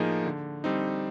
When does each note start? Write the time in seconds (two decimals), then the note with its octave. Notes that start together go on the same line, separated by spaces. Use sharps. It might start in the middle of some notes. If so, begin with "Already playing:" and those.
Already playing: A2 F3 A#3 D#4 G#4
0.25 D3
0.64 G3 C4 D#4